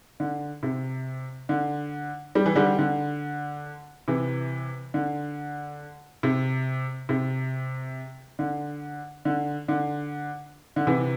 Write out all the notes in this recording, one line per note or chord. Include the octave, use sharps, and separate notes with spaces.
D3
C3
D3
G3
E3
D3 G3
D3
C3 E3
D3
C3
C3
D3
D3
D3
D3
C3 E3